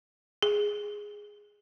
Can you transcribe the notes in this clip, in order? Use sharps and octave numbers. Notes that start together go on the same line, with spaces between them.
G#4